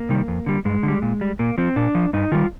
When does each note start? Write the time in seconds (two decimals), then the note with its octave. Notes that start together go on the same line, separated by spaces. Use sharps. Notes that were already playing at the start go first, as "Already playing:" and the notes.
Already playing: A#3
0.09 C3 D#3 G3
0.28 F2
0.46 D3 G3
0.65 G2 G#3
0.83 D3 G3
1.02 A#2
1.21 G3
1.39 A#2 A#3
1.58 F3 C4
1.76 A#2 D4
1.95 F3
2.13 G2 D#4
2.32 D#3 G3 F4